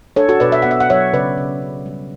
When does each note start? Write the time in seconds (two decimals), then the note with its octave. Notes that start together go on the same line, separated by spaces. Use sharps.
0.16 D4 A4 C#5
0.29 F#4 A4
0.40 B2 B4 D5
0.52 E5
0.62 B3 F#5
0.71 E5
0.80 F#5
0.90 F#3 C#5 E5
1.13 C#3 B4 D5
1.38 C#3
1.62 C#4
1.86 G3